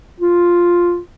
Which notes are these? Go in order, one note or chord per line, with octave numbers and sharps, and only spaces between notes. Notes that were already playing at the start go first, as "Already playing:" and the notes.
F4